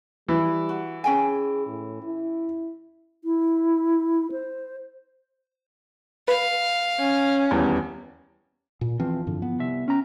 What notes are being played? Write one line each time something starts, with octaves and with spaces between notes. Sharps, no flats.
E3 G3
F#4
C#4 G#4 G5 G#5
A2
E4
E4
C5
B4 F5
C#4
D#1 E2 B3
A#2
E2 E3 F3 C4
G2 D3
B3
C2 E5
C#4 G5 A#5